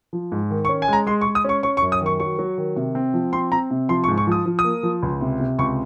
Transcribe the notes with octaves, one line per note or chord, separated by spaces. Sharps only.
F3
G#2
D#3
C#6
C#4
G#5
G#3 A#5
G#3 C6
C#6
G#3
D#6
C#4 C#6
C#4 C#6
C#6
F#2
D#6
D#3
C#6
F#3 C#6
F#3
D#3
C3
C4
F3
C4 C6
C4 A#5
C3
F3 C6
C#6
G#2
C#6
F3 D#6
F3
D#6
A#3
F3
C#2
C3
C3
C#2 C#6